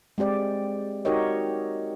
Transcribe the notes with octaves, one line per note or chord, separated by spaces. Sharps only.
G#3 C4 G4 D5
D#4 F#4 G4 A#4 C#5 D#5